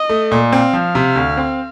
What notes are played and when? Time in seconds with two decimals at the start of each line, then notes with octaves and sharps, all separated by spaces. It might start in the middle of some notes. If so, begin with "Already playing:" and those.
Already playing: D#5
0.09 A3
0.32 A#2
0.52 C4 F5
0.73 F3
0.95 C3
1.16 D2
1.37 C4